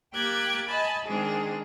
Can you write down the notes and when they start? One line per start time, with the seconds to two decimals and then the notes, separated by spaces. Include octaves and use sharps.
0.15 A#3 G4 G5 F#6 G#6 A6
0.67 D#5 G#5 A5 B5
1.07 D#3 G#3 C4 D4 G#4